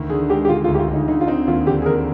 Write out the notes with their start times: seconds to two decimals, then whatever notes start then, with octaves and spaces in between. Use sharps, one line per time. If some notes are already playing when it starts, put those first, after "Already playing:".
Already playing: D2 D#3
0.10 D3 G#4
0.29 G#3 G4
0.45 G4
0.49 D3 F4
0.64 F4
0.68 D2
0.75 G4
0.79 F4
0.88 D2
0.94 D#4
1.08 D3 D#4
1.21 F4
1.27 C4 D#4
1.47 D#2 F4
1.67 D3 G4
1.82 G#4
1.86 D3 A#4